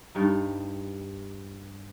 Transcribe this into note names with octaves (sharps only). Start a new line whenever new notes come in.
G2 G3 D#4